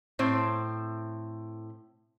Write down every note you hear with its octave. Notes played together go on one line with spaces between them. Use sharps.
A2 C4 C5